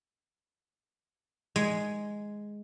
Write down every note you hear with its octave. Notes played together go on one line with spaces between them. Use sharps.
G#3